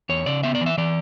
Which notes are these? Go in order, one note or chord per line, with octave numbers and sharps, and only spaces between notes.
E2 C#5
C#3 D5
B3 E5
D5
E3
E5
E3 D5